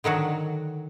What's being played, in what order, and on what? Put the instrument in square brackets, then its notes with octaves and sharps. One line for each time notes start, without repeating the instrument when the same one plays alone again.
[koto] D3 D#3 F#3 F#4